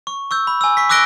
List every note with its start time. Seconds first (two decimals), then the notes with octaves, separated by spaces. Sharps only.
0.07 C#6
0.31 C#6 E6 G6
0.47 B5
0.61 G#5 E6
0.77 C#6 B6
0.89 D6 E6 F#6 A#6 D7 G7